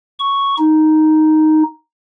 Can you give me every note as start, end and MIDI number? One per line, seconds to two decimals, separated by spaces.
0.20 0.55 85
0.58 1.63 63